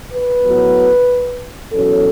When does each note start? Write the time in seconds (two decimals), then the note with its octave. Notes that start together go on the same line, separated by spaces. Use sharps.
0.13 B4
0.44 A2 F#3 B3
1.72 E2 B2 F#3 C#4 A4